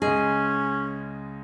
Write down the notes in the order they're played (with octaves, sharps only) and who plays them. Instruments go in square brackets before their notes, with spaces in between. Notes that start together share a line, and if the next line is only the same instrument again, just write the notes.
[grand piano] C#2 G#3 D#5 [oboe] C#4 [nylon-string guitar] G#4